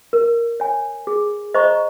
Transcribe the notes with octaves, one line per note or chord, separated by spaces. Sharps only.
A#4
C#5 G#5
G#4
C5 D#5 A#5 C#6